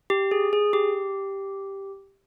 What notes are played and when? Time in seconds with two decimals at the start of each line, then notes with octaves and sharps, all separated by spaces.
0.10 G4
0.31 G#4
0.53 G#4
0.73 G4